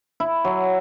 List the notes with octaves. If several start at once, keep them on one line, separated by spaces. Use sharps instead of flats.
E4
F#3